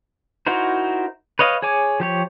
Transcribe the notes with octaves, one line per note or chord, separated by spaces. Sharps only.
D#4 E4 F#4 A#4 C5
B4 C#5 D#5 F5
G#4 C#5 G#5 D6
F3 G4 C#5